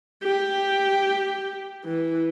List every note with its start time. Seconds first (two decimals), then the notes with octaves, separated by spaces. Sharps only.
0.24 G4
1.85 E3